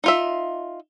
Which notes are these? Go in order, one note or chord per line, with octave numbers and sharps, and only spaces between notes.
D#4 F4 E5